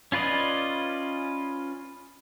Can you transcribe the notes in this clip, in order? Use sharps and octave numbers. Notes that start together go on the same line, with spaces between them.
C#4 F4 B4 D5 D#5